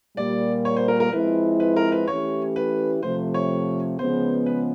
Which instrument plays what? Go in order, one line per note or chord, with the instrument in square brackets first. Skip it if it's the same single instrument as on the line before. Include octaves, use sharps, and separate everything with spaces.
[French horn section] A#2 G3 A#3 [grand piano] D5
[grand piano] C#5
C5
A#4
A#4
[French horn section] F3 G#3 C4 E4 [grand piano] B4
[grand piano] B4
A#4
B4
[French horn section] E3 A3 C#4 E4 G4 [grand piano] C#5
[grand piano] B4
[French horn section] C3 F3 A3 [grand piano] C5
[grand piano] C#5
[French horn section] C#3 F3 G#3 B3 [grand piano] C5
[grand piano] B4